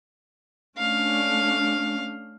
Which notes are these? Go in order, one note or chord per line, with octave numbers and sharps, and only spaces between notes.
A3 C#4 D4 F5